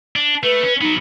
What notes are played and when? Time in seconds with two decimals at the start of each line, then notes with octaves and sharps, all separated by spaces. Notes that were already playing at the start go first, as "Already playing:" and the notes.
0.16 D4
0.43 A3 B4
0.63 C#4
0.81 F#3 B3 D#4